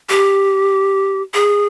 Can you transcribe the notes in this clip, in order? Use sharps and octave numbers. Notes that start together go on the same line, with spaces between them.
G4
G#4